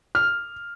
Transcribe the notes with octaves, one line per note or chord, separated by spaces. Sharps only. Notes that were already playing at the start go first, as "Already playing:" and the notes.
F6